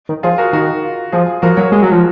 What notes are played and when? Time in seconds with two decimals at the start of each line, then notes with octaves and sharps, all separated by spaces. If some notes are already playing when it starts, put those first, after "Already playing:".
0.09 D#3
0.23 F3 F4 G#4
0.38 F#4 A#4
0.53 D#3 F#4 A#4
0.82 F4
1.12 F3 F4 G#4
1.42 F3 F#4 A#4
1.57 F#3 A#4 C#5
1.72 G#3
1.83 F#3
1.92 F3